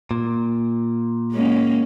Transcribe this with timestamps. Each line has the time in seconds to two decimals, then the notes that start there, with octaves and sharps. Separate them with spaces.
0.11 A#2
1.32 G#3 A#3 C#4